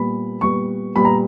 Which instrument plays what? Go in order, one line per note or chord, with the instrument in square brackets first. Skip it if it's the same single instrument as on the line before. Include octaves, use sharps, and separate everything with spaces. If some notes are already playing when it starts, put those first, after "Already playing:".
Already playing: [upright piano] A#2 G3 B3 B5
A#2 G3 B3 C#6
A#2 G3 B3 B5
A#5